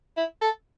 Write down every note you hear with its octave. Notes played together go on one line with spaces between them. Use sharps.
E4
A4